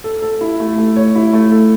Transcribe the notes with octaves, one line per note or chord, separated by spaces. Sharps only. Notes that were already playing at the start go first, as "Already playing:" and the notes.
A4
A4
E4
A3
A3
C#5
E4
A3
A4